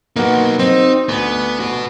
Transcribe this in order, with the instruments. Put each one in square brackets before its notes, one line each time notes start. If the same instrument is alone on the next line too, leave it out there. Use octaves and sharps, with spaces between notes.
[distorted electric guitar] F#3 D#4 [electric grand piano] A#3 B3 F#4
[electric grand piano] C4 [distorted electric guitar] D#4
[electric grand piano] D2 [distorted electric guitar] B3
[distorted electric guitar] F#4 B4